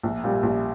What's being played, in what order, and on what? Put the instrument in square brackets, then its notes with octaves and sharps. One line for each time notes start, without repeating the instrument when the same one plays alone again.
[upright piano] A#1
A#2 G3
A#1